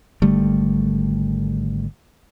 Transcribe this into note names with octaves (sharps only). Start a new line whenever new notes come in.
G#1 D3 G3 A3